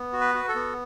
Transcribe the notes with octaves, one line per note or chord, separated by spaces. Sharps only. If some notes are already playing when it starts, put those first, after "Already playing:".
Already playing: B3
F#4
B4
F#4
A4
B3